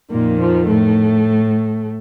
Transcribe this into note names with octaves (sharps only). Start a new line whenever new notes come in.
F2 A#2 D#3 A#3
F3
A2 A3